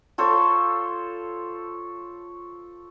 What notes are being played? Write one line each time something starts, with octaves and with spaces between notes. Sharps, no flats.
F4 A4 C5 C#5